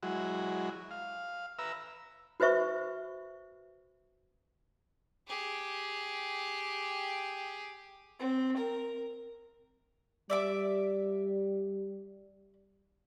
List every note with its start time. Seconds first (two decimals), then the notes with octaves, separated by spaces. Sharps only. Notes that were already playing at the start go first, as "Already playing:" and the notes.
0.03 F#3 G#3 E4 F#4
0.91 F5
1.59 B4 E5 A#5 E6
2.40 F#4 B4 C5 E5 C#6
5.28 G4 G#4
8.20 C4
8.57 A#4
10.30 G3 D5 E5 D6